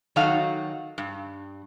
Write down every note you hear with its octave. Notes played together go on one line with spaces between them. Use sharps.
D#3 F#3 D#4 F#4 A4 F5
G2